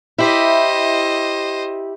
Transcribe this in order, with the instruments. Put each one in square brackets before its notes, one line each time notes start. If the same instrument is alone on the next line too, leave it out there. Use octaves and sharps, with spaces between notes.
[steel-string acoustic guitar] E4 G4 [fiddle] C5 D#5